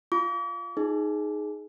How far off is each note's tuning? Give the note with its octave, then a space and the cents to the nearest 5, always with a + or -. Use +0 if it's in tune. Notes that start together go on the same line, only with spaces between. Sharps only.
F4 +0 D6 -45
D#4 +0 G#4 +10